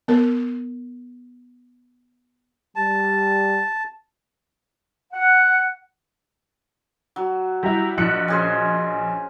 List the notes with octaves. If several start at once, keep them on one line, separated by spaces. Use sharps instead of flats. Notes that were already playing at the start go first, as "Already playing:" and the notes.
B3 A#4
G3 A5
F#5
F#3
G3 E4 A#5
A#1 D#5 F#6 C#7
C#4 G#4 C5